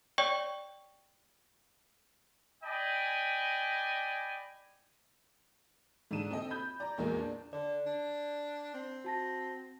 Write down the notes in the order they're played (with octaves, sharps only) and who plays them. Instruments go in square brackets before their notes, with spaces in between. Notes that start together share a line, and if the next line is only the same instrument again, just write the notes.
[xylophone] C#5 D5 G5 C#6
[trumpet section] D5 D#5 G5 G#5 B5
[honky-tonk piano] G#2 D3 D4 D#7 E7
C4 A4 D#5
B5 G6
D5 A#5
A#1 E2 F#3 G#3 A#3
D4
[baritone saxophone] D3 [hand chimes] D5
[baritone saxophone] D4
C4
[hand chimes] F#4 A5 A#6